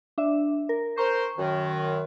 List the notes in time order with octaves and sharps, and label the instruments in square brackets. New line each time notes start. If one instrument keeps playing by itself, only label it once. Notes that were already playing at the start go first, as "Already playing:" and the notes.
[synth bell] D4 E5
A#4
[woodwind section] A#4 C5 [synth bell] C#6
[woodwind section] F#2 D#3